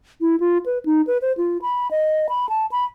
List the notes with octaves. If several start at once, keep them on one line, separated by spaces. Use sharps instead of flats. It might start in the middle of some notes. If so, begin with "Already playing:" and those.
E4
F4
B4
D#4
B4
C5
F4
B5
D#5
B5
A5
B5